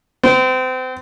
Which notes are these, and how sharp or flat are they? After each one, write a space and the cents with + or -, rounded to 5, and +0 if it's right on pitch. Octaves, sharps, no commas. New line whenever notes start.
C4 -30